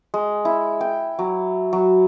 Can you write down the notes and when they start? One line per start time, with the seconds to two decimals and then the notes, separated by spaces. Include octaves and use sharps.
0.14 G#3
0.45 E4
0.81 G5
1.19 F#3
1.73 F#3